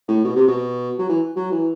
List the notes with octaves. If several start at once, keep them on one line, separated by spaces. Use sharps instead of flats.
A2
B2
C3
B2
F#3
E3
F#3
E3